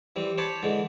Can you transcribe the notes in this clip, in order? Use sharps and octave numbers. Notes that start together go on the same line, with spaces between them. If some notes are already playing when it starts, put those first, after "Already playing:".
E3 G3 C4
C5 C#5 A5 B5 D6
D3 E3 G#3